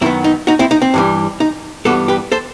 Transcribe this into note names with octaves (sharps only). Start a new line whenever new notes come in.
F#2 D#3 F#3 B3 C4 E4
D#4
D#4 F#4
C4 E4
D#4
C4
G2 E3 G3
D#4
G2 E3 G3 B3 F#4 A4
G4 B4
A4 C5